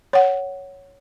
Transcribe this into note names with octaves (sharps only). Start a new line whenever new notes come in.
C#5 F#5